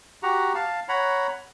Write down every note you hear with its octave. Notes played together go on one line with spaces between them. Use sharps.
F#4 G4 F#5 A#5
F5 A5
C#5 F#5 A#5 B5